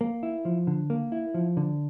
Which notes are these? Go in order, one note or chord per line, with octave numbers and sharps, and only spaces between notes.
A#3
E4
F3
D3
A#3
E4
F3
D3